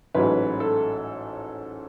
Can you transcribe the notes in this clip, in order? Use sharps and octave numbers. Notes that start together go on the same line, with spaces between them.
A1 G#2 F#3 B4
A4